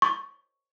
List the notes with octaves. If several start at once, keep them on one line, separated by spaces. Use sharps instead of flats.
C#6